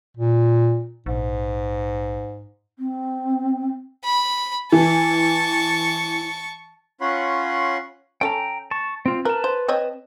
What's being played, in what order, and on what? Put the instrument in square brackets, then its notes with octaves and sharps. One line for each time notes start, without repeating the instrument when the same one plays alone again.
[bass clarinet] A#2
[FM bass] A#1 [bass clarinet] G#2
[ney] C4
[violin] B5
[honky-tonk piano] E3 [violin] A5 C#6
[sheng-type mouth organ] C#4 F4 C#5 F#5 B5 C6
[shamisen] C#4 A4 [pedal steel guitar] G5 A#5
[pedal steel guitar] A5 C#6
C4 F4
[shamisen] A#4 [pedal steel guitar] B4 A5
[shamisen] C5
C4 C#5 D#5